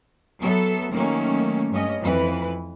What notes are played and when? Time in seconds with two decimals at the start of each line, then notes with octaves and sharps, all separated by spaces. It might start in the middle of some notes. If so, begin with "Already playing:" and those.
0.39 F#3 B3 A4 E5
0.92 D#3 F#3 A3 A#3 C#4
1.70 G2 C#4 D#5
2.01 F2 E3 B4